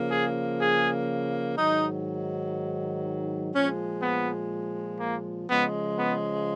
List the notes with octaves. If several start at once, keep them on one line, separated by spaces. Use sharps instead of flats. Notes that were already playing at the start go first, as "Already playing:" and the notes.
Already playing: C#3 F3 A#3
G#4
G#4
G#2 D#3 F#3 D#4
A#2 F3 G#3 C#4
B3
A#3
C#3 F3 G#3 B3
B3